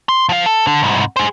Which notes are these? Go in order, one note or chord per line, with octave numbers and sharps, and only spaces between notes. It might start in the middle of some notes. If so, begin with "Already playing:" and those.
C6
F3 F5
A4
D3
C2 G#2
G#4 C5